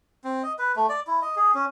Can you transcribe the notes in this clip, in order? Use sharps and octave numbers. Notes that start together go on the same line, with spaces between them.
C4
D#5
B4
A3
D5
E4
D#5
G#4
C#4